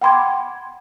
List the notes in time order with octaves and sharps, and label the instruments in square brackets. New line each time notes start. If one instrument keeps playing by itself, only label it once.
[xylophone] F#5 G5 B5 C6 D6 G#6